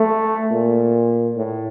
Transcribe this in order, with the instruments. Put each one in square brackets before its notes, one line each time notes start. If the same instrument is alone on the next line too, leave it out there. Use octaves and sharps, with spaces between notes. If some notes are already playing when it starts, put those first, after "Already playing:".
Already playing: [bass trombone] A3
A#2
A2